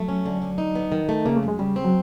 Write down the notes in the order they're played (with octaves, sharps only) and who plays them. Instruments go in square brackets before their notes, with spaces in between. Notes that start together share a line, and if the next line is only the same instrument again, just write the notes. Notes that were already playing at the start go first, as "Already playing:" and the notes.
Already playing: [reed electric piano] F#3 [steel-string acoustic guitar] A3
[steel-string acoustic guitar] C#4
D3
D3
D#4
B3
D#3
A3
[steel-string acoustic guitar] C#3 [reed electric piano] A#3
[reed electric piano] A3
[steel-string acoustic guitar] F#2
[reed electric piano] G#3
[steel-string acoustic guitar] C#3 [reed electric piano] G3
[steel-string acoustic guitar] C4
[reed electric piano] F#3